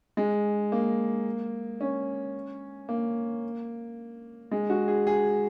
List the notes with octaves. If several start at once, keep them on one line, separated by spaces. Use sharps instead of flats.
G#3
A#3
C#4
A#3
G#3
F#4
G#4
G#4